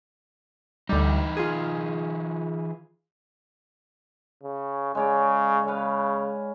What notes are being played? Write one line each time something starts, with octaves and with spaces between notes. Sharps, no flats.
D2 E3 G3 D#4
F4 G#4
C#3
C#3 G#3 C#5 D5
C#3 B4 C#5 F5